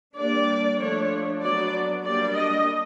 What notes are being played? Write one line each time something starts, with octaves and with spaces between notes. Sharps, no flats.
G3 A#3 D4 D5
F3 A3 D4 C#5
F#3 B3 D4 D5
G3 A#3 D4 D5
D#5